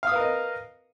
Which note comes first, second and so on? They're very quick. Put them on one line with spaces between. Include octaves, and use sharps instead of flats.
F5 D#6 B4 A#4 D#5